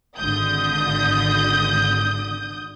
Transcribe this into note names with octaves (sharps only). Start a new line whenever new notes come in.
G#1 D3 D#6 G6